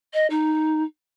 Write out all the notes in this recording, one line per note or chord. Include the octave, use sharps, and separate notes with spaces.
D#5
D#4